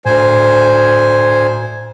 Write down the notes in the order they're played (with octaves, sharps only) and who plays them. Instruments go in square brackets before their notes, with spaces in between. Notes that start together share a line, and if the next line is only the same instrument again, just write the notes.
[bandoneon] D2 C5 G#5 [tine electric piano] A2